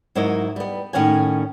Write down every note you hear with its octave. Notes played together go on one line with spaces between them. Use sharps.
G#2 F#3 E4 A#4 C#5 D#5
G3 B3
A2 D#3 C#4 C#5 F#5 G#5